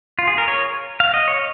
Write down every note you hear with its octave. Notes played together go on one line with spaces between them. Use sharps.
F4
G#4
A#4
C#5
F5
D#5
C#5